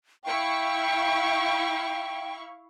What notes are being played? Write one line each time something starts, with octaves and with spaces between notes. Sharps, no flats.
E4 F5 G5 C#6